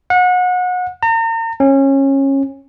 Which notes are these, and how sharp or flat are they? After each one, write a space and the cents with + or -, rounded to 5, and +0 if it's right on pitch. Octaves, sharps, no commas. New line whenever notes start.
F#5 -30
A#5 -40
C#4 -25